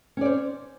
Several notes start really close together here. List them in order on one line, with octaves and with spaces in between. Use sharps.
C#4 D5 C5